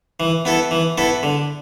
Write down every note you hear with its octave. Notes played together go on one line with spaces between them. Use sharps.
E3
B3 E4 A4
E3
B3 E4 A4
D3